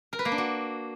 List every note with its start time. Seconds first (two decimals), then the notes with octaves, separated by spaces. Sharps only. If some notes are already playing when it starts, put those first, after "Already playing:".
0.13 A#4
0.19 B4
0.25 A#3
0.32 D4
0.38 F#4